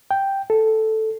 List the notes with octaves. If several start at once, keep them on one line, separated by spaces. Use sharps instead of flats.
G5
A4